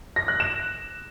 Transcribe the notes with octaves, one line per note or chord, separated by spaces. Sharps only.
A#6
F#6
E7